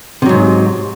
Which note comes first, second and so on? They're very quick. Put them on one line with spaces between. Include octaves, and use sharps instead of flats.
C3 F#3 G#2